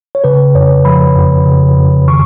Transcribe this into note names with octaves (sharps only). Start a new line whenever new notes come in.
C#5
C#3 B4
F2 C#5
F3 B5
F2
C#3
F2
D#3 C#6